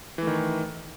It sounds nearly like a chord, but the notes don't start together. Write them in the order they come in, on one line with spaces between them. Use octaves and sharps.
E3 A3 D#3